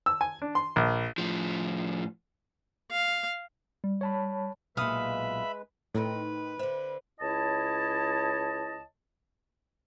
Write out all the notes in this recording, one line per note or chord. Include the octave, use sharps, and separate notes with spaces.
E6
G#5
D4
C6
A#1
A2 F3
F5
G3
C#5 A5 B5
B1 A#2 G#3 B4 E5 F5 B5 D#6
A2 D#3 C4 D#4 B4
D3 C5 E5
C#2 E4 C#5 D#5 A5